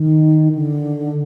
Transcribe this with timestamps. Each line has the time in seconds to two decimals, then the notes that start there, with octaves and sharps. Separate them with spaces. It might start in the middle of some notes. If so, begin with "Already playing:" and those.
Already playing: D#3
0.55 D3